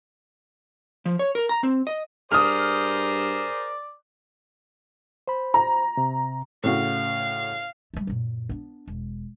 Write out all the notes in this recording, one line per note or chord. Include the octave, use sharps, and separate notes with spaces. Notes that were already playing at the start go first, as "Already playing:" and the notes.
F3
C#5
A#4
A#5
C4
D#5
G2 G#4 A#4 C5 D5 D#6 F6
C5 B5
A#5
C3
A2 C#3 F#4 F5
G3 A3
F#2 A#2
B3 D4
E1